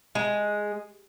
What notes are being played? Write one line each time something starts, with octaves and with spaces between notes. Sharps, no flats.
G#3